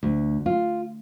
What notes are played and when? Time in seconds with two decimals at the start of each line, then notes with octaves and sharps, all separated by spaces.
0.03 D2
0.46 F4